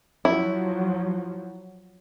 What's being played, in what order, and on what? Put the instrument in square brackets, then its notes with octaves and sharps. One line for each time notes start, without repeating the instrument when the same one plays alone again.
[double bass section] F3 F#3 [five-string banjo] E4